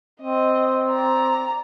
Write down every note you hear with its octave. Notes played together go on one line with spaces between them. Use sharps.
C4 D#5
D5 A#5